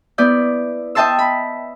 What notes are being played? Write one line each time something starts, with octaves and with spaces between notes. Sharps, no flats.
B3 E4 D5 G6
D#5 E5 G5 A5 C6 E6
B5